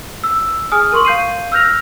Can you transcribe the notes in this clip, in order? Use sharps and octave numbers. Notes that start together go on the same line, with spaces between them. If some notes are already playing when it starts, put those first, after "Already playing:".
E6
G#4 G#5 D#6 F6
A#4 C6 C#6 F#7
F5 G6 C7 D#7
E6 F6 G6 A#6 F7